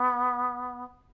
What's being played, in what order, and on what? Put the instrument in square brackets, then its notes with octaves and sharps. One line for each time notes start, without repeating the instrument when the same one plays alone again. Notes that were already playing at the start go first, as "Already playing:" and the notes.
Already playing: [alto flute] B3